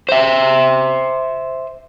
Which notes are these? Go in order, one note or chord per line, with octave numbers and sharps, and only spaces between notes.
C5 E5